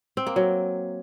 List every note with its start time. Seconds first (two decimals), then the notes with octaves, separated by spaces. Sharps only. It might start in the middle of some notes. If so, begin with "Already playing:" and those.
0.17 C4
0.27 A#3
0.36 F#3